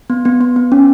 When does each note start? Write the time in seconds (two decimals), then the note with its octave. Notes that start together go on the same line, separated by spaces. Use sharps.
0.10 B3
0.25 B3
0.41 B3
0.56 B3
0.72 C#4